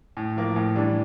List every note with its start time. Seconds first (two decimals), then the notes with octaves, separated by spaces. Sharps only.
0.17 A2
0.36 F3 A#3
0.56 A2
0.75 E3 G3 D4